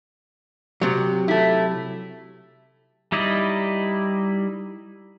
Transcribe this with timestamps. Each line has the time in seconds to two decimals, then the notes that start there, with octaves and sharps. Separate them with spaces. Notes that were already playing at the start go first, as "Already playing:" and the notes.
0.81 C3 F#3
1.28 A3 E4
3.12 G3 D#4 E4 D5 D#5